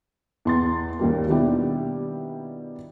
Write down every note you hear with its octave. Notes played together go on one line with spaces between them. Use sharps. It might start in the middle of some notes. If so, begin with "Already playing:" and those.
E2 C6 A6
D#2 D#3 G3 A#3
B2 D#3 G3 D4 E4 G4